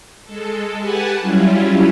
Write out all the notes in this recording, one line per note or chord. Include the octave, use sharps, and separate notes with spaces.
G#3 A4
G4 B4 F#5 G#5 A5
F#3 G3 C#4 E4 F4